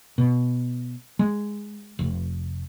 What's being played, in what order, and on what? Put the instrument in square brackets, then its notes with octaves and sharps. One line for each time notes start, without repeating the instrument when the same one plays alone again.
[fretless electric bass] B2
G#3
F1